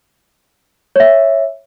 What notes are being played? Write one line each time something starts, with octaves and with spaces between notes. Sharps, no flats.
C#5 E5